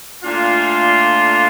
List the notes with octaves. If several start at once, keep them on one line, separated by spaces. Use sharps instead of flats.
A#2 A3 D4 F4